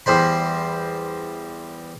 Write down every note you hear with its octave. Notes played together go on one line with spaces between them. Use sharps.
E2 G3 C5 B5